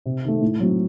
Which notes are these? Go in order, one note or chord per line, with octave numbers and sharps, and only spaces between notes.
C3
D#3 A3
A2
F#3 C4